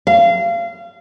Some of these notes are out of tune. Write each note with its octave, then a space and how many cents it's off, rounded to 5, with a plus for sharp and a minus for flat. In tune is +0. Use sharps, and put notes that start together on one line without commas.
F5 -30